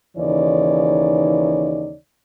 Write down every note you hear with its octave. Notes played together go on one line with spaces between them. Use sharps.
D#2 C#3 E3 D#4 C#5 D5